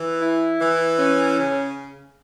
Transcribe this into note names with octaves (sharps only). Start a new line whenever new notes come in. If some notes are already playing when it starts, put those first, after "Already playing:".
Already playing: E3
E4
E3
C#4
C#3